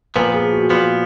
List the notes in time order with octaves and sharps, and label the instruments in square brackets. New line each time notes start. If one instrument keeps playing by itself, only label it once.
[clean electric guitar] A#2 F3 B3 [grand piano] B4
[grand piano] G#4
F#4
[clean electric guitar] A#2 F3 B3